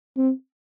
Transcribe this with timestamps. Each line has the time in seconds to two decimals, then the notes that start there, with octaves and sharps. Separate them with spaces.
0.17 C4